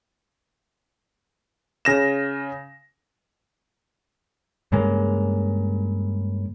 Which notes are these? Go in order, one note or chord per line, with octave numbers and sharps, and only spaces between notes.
C#3 A#6 E7
G2 C#3 G#3 A#3